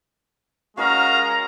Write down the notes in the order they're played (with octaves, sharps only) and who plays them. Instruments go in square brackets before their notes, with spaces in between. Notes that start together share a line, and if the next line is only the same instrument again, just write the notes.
[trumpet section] G#3 A#5 [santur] C#4 A#4 D#5 [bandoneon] F#4 F5